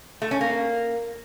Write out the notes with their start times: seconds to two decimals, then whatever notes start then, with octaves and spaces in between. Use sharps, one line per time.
0.22 A3
0.31 C#4
0.41 A#3